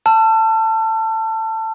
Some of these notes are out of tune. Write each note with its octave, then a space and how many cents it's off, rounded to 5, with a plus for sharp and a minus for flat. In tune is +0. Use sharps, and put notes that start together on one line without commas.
A5 +15 E6 +45